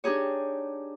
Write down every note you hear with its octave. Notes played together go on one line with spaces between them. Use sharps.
D4 D#4 G4 G#4 C#5